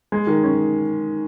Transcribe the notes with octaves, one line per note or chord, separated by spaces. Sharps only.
G#3
D#3
C#4